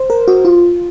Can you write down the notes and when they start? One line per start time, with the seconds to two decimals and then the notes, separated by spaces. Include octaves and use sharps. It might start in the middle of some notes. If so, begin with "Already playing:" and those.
Already playing: C5
0.10 A#4
0.28 F#4
0.45 F4